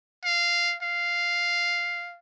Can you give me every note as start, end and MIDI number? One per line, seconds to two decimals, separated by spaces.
0.25 0.76 77
0.82 2.19 77